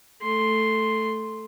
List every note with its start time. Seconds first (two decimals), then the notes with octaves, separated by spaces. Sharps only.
0.22 A3 C6